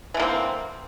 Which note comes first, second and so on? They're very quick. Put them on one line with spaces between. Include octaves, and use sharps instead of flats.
E3 D3 A#3 C4